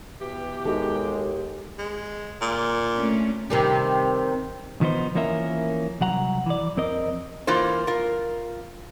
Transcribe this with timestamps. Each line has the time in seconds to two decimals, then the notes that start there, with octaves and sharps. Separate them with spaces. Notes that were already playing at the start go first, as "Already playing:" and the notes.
0.21 B2 E3 G4
0.66 D#2 G#3 D#4 F#4 A4
1.78 G#3
2.41 A#2
2.93 A3 C#4 D4
3.50 C3 D#3 G3
4.81 D#3 F3 B3 D#4 C5
5.15 E3 F3 A#3 C#4 A#4 E5
6.01 C2 F#3 F#5 A#5
6.46 E3 D5
6.77 F2 C4 A#4 D#5
7.47 E3 A#3 F4 C5
7.87 F4 A#4